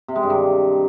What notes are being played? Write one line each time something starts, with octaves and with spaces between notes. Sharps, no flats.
C3
G#3
G2
D#3